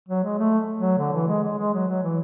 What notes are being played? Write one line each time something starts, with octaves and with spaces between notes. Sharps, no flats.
F#3
G#3
A3
F#3
D3
E3
G#3
G#3
G#3
F#3
F#3
E3